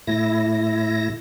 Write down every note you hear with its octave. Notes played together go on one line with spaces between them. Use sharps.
A2 E4 A#6